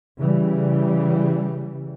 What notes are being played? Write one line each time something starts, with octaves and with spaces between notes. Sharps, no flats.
C#3 E3 G3